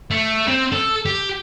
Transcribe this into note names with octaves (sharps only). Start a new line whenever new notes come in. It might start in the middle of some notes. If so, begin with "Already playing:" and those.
A3
C4
A4
G4